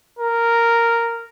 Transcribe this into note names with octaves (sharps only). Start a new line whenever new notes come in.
A#4